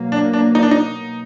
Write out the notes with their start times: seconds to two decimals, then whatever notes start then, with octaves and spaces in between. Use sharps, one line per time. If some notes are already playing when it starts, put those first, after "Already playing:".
Already playing: B2 F#3 A#3
0.12 D4
0.33 D4
0.55 D#4
0.63 D4
0.71 D#4